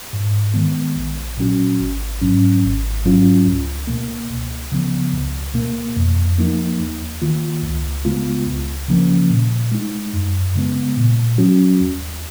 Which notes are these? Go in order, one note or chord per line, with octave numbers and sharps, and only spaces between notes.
G#2
D#3 G#3 B3
A#1
A#2 F#3 C#4 F#4
G#1
G#2 F#3 C#4
G#1
G#2 F#3 C#4 F4
C#2
B2 A#3
C#2
C#3 F3 B3
C#2
B2 A#3
F2
F3 A#3 D#4
D#2
D#3 A#3 F4
C#2
C#3 G#3 B3 F4
C#2
C#3 F3 A#3 C#4
A#2
G#3 D#4
F#2
C#3 G#3 B3
A#2
F#3 C#4 F#4
D#2